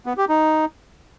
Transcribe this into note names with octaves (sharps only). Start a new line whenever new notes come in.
B3
G4
D#4